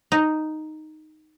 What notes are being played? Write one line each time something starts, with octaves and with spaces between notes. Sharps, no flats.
D#4